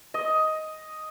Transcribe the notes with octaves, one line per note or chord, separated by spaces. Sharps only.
D#5